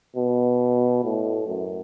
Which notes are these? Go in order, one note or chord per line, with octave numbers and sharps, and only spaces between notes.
B2
A2
F#2